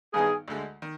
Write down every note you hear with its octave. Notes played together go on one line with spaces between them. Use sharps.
G2 D#3 B3 D#4 G#4
D2 D3 G#3
D#3